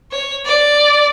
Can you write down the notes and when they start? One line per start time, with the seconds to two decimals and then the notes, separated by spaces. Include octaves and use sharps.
0.11 C#5
0.45 D5